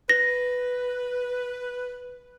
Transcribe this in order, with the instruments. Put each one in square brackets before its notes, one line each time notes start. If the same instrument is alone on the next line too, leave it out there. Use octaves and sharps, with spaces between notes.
[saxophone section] B4 [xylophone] A#6